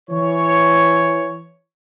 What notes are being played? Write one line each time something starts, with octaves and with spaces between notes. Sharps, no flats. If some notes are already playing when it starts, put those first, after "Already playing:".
E3 C#5